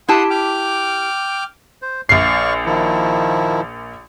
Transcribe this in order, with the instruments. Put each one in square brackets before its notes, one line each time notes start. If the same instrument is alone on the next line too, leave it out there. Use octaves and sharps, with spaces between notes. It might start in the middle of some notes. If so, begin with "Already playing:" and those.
[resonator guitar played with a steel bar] E4 G4 A5 [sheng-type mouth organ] F#5 C6 D#6
[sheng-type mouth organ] G5 D6 F6
[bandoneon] C5
[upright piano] A#1 C7 [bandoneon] D5 F5 C#6
[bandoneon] D#3 F3 E4